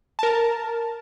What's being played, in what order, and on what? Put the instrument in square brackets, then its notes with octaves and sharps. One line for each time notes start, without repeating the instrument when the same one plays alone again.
[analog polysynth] A#4 A5